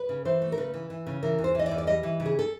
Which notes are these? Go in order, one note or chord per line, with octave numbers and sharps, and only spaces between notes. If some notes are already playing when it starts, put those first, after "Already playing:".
Already playing: B4
C#3
E3 C5
A3
A#4
C#3 B4
E3
E3
C#3
E3 A#4
E2
C5
E3 D#5
D5
E2
D5
G3 D#5
E3
C#3
G#4
A4